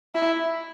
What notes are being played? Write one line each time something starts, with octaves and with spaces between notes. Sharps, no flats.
E4